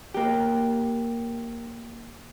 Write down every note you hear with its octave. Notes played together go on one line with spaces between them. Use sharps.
A#3 G4